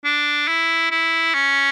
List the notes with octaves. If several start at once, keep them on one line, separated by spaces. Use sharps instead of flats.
D4
E4
E4
C#4